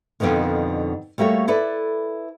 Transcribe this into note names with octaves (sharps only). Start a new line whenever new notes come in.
F2 G#2 B2 D3 D#3
G3 A3 A#3 F#4 C#5
E4 A4 B4 D5